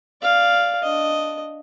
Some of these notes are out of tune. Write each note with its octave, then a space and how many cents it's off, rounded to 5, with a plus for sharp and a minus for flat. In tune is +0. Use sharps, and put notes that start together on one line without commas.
D5 +0 F5 +0
D4 +0 D#5 +0